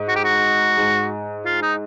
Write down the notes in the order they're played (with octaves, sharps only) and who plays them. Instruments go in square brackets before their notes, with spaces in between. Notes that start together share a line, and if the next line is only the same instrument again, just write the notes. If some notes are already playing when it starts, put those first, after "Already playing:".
Already playing: [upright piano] G#2
[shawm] F#4
G4
F#4
[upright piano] G#2
[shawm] F4
D#4